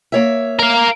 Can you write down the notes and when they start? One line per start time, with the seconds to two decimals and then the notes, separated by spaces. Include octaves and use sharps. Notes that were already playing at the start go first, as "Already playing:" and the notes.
0.12 A#3 C#5 E5
0.59 A#4 F5